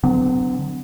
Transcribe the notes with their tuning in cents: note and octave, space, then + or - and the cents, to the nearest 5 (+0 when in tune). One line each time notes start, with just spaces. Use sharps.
D3 +0 F#3 +0 B3 +45